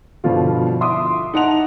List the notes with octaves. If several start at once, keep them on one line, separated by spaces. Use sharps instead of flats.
G2 B2 D3 F3 F4
E5 C6 D6 D#6
D#4 F#5 A5 F7